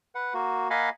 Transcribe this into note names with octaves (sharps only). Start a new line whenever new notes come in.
B4 F#5
A#3 F#4
A#3 D#5 F5 F#5 G#5 B5